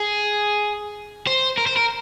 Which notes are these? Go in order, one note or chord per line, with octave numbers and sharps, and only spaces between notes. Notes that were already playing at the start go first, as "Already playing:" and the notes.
Already playing: G#4
C5
A#4
C5
A#4